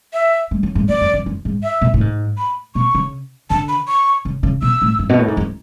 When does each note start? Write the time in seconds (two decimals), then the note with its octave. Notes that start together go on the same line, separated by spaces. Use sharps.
0.14 E5
0.51 G#3
0.63 F#3
0.75 G#2
0.89 G#2 D5
1.01 F#2
1.14 F#2
1.26 F#2
1.45 G#2
1.63 E5
1.82 B2
1.94 A2
2.01 G#2
2.38 B5
2.75 B2 C#6
2.95 C#3
3.50 D3 A5
3.69 B5
3.88 C#6
4.25 C#3
4.43 C#3
4.62 B2 E6
4.82 A2
4.99 G#2
5.09 B2
5.19 A2
5.28 G#2
5.37 F#2